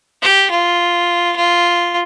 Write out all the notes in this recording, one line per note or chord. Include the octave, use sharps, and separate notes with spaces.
G4
F4
F4